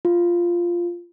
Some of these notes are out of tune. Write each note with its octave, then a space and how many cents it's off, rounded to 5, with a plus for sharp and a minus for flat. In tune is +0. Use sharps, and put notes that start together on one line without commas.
F4 -5